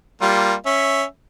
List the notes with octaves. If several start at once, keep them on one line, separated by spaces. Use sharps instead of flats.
G3 A#3 F4
C#4 E5